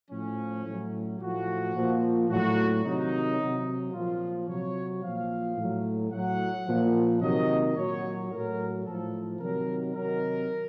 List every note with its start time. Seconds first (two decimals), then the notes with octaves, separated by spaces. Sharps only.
0.11 A2 F3 C#4
0.66 A2 F#3
1.20 A2 F3 F#4
1.75 A#2 F3
2.29 A2 F#3 F#4
2.84 C3 D#3 F#3 D#4
3.39 C3 F#3
3.94 A#2 F3 F4
4.48 C3 F#3 C#5
5.03 A#2 F3 F5
5.58 A2 F#3
6.12 A2 F#3 F#5
6.67 A#2 F3
7.21 C3 D#3 F#3 D#5
7.76 A#2 F#3 C#5
8.31 A2 F#3 A#4
8.85 A2 F3 A4
9.39 C3 D#3 F#3 A#4
9.94 C3 D#3 F#3 A#4